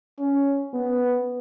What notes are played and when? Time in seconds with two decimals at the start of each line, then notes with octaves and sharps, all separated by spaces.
0.19 C#4
0.74 B3